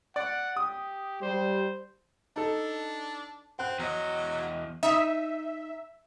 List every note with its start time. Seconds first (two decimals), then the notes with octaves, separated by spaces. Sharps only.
0.16 D5 F#5
0.57 G4 D#6
1.22 G3 C5
2.36 D4 D#4 A4
3.59 C4 F#5 F#6
3.79 E2 F#3 D#5
4.83 D#4 E5